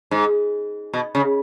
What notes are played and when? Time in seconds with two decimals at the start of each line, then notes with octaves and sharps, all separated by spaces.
0.11 G#2
0.93 B2
1.15 C#3